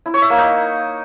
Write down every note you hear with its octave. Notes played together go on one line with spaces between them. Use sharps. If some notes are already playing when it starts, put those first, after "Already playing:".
E4
C#5
E5
A#3
D#4